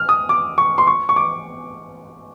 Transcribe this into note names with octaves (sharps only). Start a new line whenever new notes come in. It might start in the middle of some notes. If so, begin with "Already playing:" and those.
Already playing: F6
D#6
D6
C#6
C6
C#6
C#6
D6